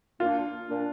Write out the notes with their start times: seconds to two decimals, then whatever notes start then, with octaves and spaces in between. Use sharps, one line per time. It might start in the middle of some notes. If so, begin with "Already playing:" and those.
0.20 A#2 A#3 D4 F4
0.67 A#2 A#3 D4